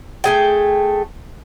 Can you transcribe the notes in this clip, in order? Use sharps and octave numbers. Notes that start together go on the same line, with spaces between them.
A3 G#4 G5